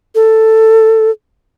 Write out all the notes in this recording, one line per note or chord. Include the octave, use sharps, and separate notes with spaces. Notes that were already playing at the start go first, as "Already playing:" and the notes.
A4